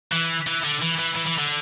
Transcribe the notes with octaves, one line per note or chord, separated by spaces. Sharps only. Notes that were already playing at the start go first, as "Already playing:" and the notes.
E3
E3
D3
E3
E3
E3
E3
D3